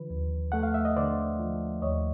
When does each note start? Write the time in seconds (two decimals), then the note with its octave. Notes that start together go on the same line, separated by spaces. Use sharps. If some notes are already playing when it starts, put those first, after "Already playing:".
Already playing: D3 F3 B4
0.10 D#2
0.52 A3 F#5
0.63 F5
0.74 E5
0.85 D#5
0.97 D3 C5 D5
1.39 F3
1.82 D#2 C#5 D#5